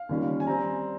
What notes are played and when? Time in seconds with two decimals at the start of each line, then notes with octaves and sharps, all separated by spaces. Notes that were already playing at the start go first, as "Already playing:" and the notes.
Already playing: F5
0.09 D#2 D#3 G3 C#4 F4
0.40 G#5
0.47 G3 C4 A#5